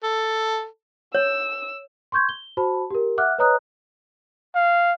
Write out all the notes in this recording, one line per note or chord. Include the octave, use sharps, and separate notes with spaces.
A4
C#5 E6
C6 C#6 G6 G#6
G7
F#4 C5 A5 B5
G4 A#4
E5 F#5 D6 F6 F#6
B4 C#5 D#5 A#5 D#6 F#6
F5